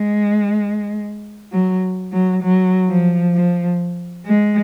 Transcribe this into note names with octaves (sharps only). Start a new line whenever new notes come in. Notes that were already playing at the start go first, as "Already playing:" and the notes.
Already playing: G#3
F#3
F#3
F#3
F3
F3
G#3